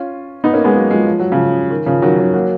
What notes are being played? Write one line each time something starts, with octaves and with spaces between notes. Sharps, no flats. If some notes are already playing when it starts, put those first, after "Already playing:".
Already playing: C#4 F4
B3 D#4
A#3 C#4
G#3 B3
F#3 A#3
F3 G#3
F3
F#3
C#3 F3
D#3
C#3 F3
D#3 F#3
D#3 F#3
F#3 A#3